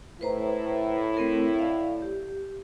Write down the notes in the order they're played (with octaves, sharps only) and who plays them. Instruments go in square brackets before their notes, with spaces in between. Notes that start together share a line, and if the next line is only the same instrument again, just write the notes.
[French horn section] A2 E4 [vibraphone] B4 C5 A#5
[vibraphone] A3 C4 A#4
D5 F5
G4